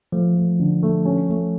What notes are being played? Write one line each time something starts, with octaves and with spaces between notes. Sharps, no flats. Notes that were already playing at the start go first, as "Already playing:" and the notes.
F3 A3
A3
D3
A3
C#4
A3